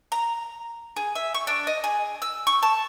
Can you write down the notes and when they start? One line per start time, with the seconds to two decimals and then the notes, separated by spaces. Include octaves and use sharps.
0.12 A#5
0.96 G#4
1.15 E5
1.34 C#6
1.47 D4
1.67 D#5
1.84 G#4
2.22 E6
2.47 C#6
2.63 A5